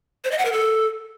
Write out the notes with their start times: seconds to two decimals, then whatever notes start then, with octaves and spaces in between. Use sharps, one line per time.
0.24 C5
0.31 D#5
0.38 F#5
0.45 A#4
0.52 A4